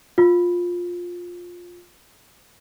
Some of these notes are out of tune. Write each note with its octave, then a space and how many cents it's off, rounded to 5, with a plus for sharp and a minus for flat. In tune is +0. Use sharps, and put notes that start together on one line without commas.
F4 +15